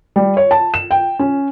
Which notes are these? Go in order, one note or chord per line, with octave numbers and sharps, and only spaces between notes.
G3
C#5
A5
E7
G5
C#4